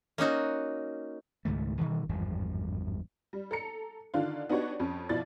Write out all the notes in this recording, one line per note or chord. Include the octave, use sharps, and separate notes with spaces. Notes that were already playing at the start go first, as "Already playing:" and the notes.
A#3 C#4 D#4 F#4
C#2 G#2 D#3 A3
B2 D#3 E3 G3
G#1 E2 G2 F3
G3
A4 A#5 C#7
D3 D#3 D4 F4
B3 D4 D#4 F#4 G4 C#5
F2 C#4
B2 F3 E4 D5 A6